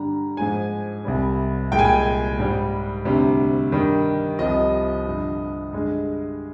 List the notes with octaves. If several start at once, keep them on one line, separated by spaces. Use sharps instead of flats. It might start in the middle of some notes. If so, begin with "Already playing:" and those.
Already playing: G2 D3 G3 A#5
G#2 F3 G#3 G#5
C2 C3 G3
C2 A#2 G#3 G5
G#5
G5
G#2 G3
D2 C3 G3
G2 D#3 G3
C2 C3 F3 D#5
G2 D3 F3
G2 D3 G#3